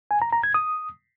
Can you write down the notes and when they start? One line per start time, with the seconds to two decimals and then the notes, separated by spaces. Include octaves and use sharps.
0.11 G#5
0.22 A#5
0.33 A#5
0.43 G#6
0.54 D#6